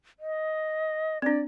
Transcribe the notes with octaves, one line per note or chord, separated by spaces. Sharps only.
D#5
C4 D4 D5